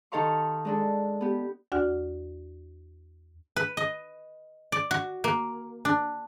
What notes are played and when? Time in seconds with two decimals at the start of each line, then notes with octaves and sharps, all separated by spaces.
0.12 D#3 D#4 A4 F5 C6 C#6
0.65 G#3 D4 A4
1.21 B3 G4
1.72 E2 D4 F#4 D5 F#5 F6
3.56 B4
3.77 D#5
4.72 D5
4.91 F#4
5.24 A#3
5.85 D4